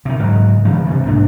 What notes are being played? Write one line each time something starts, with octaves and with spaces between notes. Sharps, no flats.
C3 D#3
G#2 C#3 F#3
C3 E3 G#3 B3
G2 C3
C2 G#2 A#3 D4